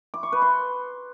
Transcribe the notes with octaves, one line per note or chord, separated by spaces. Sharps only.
D6
C#6
B4
C6